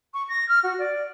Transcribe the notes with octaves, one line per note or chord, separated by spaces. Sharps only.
C#6
A#6
F6
F#4
D5